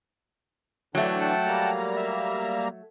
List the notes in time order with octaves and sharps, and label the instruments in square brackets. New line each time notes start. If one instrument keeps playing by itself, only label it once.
[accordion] D3 E3 D4 [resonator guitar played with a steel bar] F#3 A3 [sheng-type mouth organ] G5
[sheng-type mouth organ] F#5 G5 A5
[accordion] G3 A#3 A#5
[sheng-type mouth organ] E5